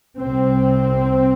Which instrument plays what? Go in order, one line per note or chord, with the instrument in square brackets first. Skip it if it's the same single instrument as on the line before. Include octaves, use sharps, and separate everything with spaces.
[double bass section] C2 C3 C4